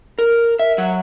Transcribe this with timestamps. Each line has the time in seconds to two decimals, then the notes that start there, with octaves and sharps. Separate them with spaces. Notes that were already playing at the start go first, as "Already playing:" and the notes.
0.19 A#4
0.59 E5
0.78 F#3